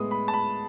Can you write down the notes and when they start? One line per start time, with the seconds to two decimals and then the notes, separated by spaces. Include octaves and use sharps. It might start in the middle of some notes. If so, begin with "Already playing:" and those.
Already playing: A2 G#3 B3 D#6
0.11 B5
0.28 A5
0.34 B5